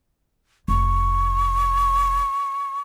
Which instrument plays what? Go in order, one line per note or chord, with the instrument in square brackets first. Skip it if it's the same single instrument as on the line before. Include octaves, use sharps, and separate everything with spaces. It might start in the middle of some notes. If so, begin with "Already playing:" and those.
[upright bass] F1 [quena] C#6